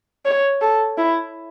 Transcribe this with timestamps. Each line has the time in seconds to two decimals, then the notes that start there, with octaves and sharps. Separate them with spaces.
0.25 C#5
0.62 A4
0.98 E4